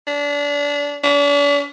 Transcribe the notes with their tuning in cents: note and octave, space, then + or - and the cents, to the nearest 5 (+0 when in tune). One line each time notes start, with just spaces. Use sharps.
D4 -25
D4 -45